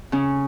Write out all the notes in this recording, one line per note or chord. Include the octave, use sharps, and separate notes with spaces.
C#3 C#4